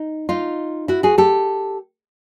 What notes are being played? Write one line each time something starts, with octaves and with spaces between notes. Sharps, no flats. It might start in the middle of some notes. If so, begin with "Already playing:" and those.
Already playing: D#4
D#4 F4
E4 F#4
F#4 G#4
G4 A4